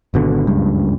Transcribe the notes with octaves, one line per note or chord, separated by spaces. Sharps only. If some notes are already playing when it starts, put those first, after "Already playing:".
G#1 B2 D3
F#1 C#2 G2